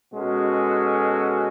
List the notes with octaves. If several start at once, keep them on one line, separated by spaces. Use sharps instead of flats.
B2 G#3 C#4 F#4 A4